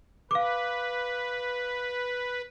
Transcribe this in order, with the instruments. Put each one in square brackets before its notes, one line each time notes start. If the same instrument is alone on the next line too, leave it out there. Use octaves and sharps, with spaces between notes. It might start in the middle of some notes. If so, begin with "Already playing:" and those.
[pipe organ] B4 [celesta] F5 D6